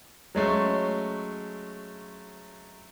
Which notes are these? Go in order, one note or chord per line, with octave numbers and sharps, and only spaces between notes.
F#3 G#3 A3 C#4